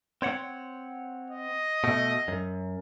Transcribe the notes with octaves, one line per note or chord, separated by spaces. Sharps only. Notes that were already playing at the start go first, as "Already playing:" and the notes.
C4 C#5 F#5
D#5
B2 A3
F#2